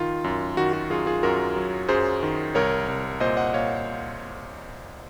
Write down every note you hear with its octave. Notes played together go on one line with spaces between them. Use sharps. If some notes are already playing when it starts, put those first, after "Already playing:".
Already playing: D#3 F4
F#2
D#3 F#4
F#4
F#2 F4 G#4
F4 G#4
F#2 F#4 A#4
F#3
F#2 G#4 C5
D#3
C2 A#4 C#5
C2
A#2 C5 D#5
D#5 F#5
A#2 C#5 F5